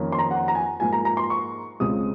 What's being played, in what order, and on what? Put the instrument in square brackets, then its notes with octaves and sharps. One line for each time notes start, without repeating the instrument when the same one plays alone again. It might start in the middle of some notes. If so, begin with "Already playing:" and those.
Already playing: [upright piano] F2 D#3 A#3 C#4
C6
A#5
F#5
A#5
G#5
G#2 F3 A#3 G#5
A#5
A#5
C6
C#6
C#2 C#3 G#3 C4 D#6